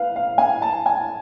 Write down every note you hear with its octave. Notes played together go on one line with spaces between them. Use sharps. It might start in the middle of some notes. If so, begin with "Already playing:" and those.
Already playing: B4 F5
F5
G#5
A5
G#5